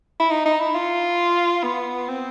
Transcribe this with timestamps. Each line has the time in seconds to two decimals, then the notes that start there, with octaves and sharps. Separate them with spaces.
0.20 E4
0.31 D#4
0.46 D#4
0.60 E4
0.75 F4
1.63 B3
2.08 C4